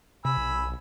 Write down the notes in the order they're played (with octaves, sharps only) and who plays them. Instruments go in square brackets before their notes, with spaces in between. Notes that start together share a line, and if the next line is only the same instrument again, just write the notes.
[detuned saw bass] C3 [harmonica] G#5 B5 E6
[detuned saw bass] B1